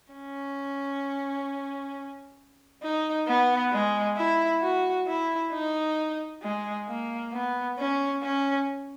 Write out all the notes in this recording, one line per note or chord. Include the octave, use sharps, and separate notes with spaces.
C#4
D#4
B3
G#3
E4
F#4
E4
D#4
G#3
A#3
B3
C#4
C#4